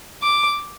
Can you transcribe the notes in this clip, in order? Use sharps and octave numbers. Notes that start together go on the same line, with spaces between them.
D6